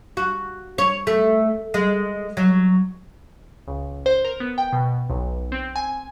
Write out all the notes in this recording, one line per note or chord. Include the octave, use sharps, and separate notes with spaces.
F#4
C#5
A3
G#3
F#3
C#2
C5
A#4
B3
G5
B2
B1
C4
G#5